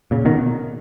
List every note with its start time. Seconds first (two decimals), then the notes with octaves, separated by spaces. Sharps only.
0.11 A#2 C#3
0.25 B2 D#3